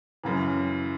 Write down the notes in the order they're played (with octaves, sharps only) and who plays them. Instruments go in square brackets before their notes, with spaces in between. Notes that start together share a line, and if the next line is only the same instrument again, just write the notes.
[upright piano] F#2 C#3 E3